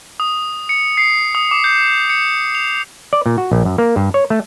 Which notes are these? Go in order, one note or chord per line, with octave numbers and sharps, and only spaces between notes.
D#6
C#7
C7
D#6
D6
G6
C#7
F7
D5
A#2
F#4
A#1
F#2
A#3
G2
C#5
A3